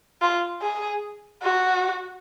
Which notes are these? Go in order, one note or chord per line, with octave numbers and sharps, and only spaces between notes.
F4
G#4
F#4